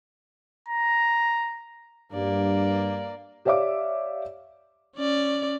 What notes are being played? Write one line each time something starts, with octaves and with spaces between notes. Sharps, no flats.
A#5
G2 A#3 D5
G4 C#5 D5 E5 F5 D6
C#4 D5